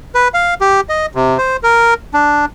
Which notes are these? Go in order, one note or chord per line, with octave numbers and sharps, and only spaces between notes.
B4
F5
G4
D#5
C3
C5
A#4
D4